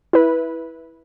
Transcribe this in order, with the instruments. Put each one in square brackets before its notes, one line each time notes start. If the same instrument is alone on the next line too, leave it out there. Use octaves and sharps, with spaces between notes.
[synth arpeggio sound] E4 B4